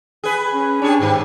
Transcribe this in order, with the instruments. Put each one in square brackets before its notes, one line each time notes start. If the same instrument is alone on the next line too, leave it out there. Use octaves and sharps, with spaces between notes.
[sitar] G#4 B4
[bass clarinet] C#4
[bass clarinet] D4 [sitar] G4 G#4 C#5
[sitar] D#2 G#3 G4 [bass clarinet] G#2